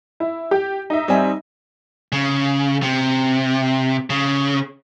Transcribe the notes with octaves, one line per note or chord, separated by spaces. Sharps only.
E4
G4
D#4 E5
G3 C4 G#5
C#3
C3
C#3